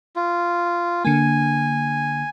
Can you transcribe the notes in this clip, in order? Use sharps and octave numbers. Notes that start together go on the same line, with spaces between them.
F4
D3 A#3 G#5